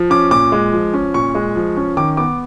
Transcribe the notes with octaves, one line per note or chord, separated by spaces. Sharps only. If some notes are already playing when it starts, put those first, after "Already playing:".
Already playing: F3
C#4 D6
A#2 D6
G#3
F3
C#4
A#2 C#6
G#3
F3
C#4
D#3 D6
B3 D6